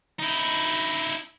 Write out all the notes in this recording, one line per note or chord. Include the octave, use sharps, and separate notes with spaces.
D#4 E4